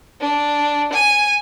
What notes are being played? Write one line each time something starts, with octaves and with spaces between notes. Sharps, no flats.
D4
G#5